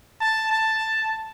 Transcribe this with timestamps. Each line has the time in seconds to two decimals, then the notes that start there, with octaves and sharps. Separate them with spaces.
0.21 A5
0.51 A5